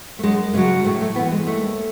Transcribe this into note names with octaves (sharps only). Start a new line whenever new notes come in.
A3
F#2 G#3
C#3 F#3 G#3
A2 A3
A3
E3 B3
G#3
D#2 A3